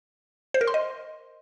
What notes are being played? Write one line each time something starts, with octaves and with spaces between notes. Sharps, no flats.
C5
A#4
C6
D#5